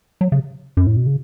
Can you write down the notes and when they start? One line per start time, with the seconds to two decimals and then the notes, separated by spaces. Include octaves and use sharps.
0.21 F#3
0.32 C#3
0.77 F#2
0.87 A2
0.97 B2
1.06 C#3